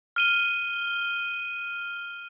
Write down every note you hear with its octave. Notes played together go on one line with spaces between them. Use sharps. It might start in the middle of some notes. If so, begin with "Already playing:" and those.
F6 D#7 G7